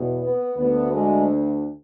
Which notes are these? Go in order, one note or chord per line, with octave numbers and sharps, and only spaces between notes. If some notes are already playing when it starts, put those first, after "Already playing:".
Already playing: E2 B2
B3
D2 D3 B3
G#3